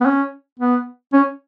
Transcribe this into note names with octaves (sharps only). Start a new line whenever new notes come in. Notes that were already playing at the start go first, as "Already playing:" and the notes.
B3
C#4
B3
C#4